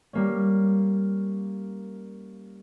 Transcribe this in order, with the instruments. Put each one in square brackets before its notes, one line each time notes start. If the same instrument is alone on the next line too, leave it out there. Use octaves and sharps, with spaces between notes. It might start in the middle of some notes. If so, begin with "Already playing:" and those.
[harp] G3 A#3 C#4